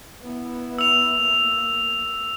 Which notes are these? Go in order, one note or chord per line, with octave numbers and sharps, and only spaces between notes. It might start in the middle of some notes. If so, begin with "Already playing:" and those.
B3 E4
E6 F7
A#3